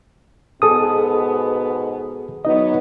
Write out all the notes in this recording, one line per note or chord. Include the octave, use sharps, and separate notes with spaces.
G#2 B2 B3 G#4 A4 D#6
F#3 B3 D#4 D#5